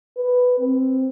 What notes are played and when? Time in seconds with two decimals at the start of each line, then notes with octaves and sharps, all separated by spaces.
0.17 B4
0.60 C4